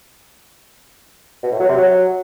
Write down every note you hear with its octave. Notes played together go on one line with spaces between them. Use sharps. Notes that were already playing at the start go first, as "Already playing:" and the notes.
B2
A2
F#3
C3
F#3